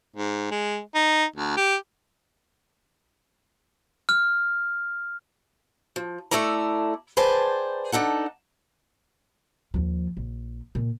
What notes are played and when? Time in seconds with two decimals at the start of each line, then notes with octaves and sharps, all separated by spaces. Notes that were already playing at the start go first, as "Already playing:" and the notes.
0.16 G#2
0.51 G#3
0.95 D#4
1.36 D2
1.57 G4
4.09 F6
5.96 F3
6.31 A3 E4 A4 D5 A#5
7.17 G#4 B4 C5 D5 G5 A5
7.92 D4 D#4 A4 F#5
9.74 D#2 F3
10.17 A#1
10.75 A#2